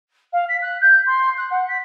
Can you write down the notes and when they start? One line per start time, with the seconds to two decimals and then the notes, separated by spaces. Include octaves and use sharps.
0.33 F5
0.49 B6
0.62 F#6
0.81 G6
1.06 C6
1.38 F#6
1.51 F#5
1.68 B6